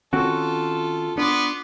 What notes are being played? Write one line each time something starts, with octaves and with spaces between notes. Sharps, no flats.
D#3 C4 C#4 F4 F#4 A4
B3 D4 C6 D6